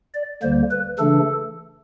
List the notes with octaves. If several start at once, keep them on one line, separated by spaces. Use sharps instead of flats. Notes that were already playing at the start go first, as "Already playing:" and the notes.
D5
D2 D3 G3 A#3 C5
B4
C#3 E3 A3 D4 A4